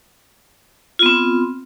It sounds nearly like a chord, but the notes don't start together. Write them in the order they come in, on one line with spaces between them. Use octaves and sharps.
F4 B3 C4